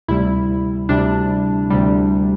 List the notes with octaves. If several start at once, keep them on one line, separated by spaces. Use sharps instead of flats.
D2 C3 G3 E4
D2 C3 G3 D4
D2 C3 G3